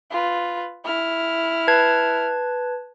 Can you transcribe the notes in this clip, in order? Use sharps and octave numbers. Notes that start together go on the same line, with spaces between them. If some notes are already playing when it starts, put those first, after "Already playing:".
F4 B4
E4 F6
B4 A5 G#6